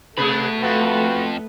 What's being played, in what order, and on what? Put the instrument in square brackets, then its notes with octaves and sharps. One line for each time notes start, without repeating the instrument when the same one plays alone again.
[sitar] C3 G#4 B4 [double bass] A3 [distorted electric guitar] F#4 B5
[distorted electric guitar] F2 [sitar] B3 [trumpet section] F4 F#4 B4